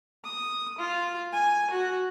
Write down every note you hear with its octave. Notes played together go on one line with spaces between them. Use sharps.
D#6
F4
G#5
F#4